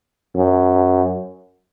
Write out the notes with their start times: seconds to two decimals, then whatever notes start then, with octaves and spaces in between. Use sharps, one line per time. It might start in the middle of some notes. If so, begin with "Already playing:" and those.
0.36 F#2